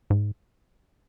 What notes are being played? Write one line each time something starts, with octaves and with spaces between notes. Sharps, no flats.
G#2